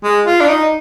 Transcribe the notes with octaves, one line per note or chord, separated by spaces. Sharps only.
G#3
F4
D4
D#4